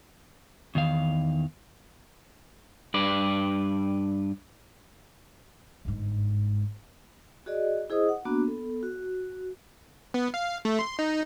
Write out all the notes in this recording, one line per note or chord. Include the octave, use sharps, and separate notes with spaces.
E2 D#3 F5
G2 B4 D5
G1 G#2
F#4 G#4 D5 D#5
E4 G#4 C5 D#5 D#6
F#5
A#3 B3 D4 F#4
B3 A4
F#4
B3
F5
A3
C6
D#4